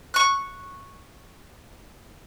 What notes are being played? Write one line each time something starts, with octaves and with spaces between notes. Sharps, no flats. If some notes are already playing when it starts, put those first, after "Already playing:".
C#6 F#6